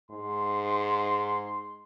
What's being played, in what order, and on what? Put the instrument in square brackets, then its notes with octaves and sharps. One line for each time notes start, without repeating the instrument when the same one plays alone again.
[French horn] G#2 [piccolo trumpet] C6